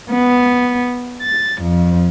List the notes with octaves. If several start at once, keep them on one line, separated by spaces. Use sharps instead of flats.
B3
A6
F2